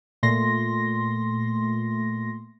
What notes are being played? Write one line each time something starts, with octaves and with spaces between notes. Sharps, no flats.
A#2 A3 C6 A#6